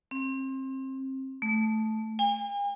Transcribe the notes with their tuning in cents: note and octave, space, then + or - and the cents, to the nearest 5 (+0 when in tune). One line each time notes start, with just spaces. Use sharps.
C4 +25
A3 -10
G#5 -45